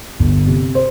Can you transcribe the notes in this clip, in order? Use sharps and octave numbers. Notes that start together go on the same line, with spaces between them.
G1
C3
C5